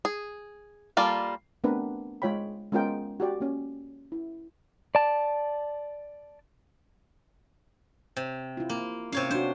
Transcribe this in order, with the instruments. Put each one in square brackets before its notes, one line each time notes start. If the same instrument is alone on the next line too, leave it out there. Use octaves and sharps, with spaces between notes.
[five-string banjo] G#4
G3 A#3 F4 A4 D5
[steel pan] A3 B3 C4 D4 A#4 B4
G#3 F4 C#5 G5 B5
G#3 B3 C#4 F4 A#4 G5
F#4 G4 D5
A#3 C#4
E4
[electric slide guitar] D5 A5
[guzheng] C3
[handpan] E4 F4
[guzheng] A#3
[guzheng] C3 C#5 F5 [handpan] C#4
[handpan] D4 F#4 [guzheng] C5